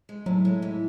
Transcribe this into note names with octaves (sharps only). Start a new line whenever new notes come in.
G#3
A2 F#3
G#3
E3